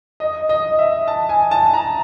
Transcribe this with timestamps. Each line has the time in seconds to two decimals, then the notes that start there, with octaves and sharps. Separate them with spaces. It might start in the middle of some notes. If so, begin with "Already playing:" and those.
0.20 D#5
0.49 D#5
0.79 E5
1.08 A5
1.29 G#5
1.51 A5
1.73 A#5